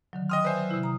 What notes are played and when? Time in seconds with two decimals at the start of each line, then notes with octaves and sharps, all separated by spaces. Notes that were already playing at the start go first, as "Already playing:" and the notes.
0.13 D3 D#3 F#3
0.30 D#5 G5 C6 D#6 F6
0.44 B4 C5 D5 E5 G#5 D#6
0.57 F#3
0.71 C3 E4
0.83 A#5 D#6